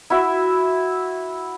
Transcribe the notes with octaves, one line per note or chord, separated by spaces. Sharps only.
E4 F#4 E5